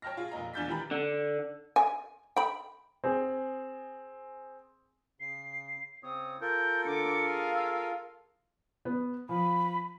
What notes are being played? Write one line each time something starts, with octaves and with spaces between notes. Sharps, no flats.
C#5 G5 A5 F6 A#6
F4 G#4
F1 A#2 D#5 A#5
E2 D4 D5 G6 A6 B6
D#3 E3 G4 A#5 B5
D3
G#5
G5 B5
C4 G#4
C#3 C7
C#3 C4 C#5 D#6
F4 A4 A#4 G6
D3 D6 C#7
G#4 F5
E6
B3
F3 B5